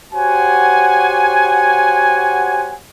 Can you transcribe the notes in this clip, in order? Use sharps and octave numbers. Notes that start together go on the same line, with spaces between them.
F#4 G4 C5 C#5 F#5 G#5